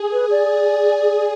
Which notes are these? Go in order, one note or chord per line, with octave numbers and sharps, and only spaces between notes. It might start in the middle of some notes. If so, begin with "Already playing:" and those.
Already playing: G#4
B4
D5